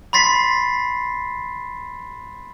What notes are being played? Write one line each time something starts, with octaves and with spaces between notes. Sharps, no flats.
B5 C6 A6 B6 C7